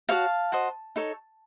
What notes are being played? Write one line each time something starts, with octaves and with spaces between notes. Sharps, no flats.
F#4 A4 C#5 F5 A5
F#4 C5 D#5
D#4 A4 C#5